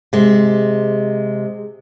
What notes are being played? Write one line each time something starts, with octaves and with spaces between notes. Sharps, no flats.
C3 G#3